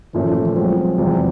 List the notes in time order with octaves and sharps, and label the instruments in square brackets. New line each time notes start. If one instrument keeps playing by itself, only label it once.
[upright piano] A#2 F3 A3 C#4 [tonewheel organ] E3
[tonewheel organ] D#3
E3
E3
[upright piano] F3 G#3 C4 [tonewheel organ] F#3
[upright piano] E2 C3 F3 G#3 C4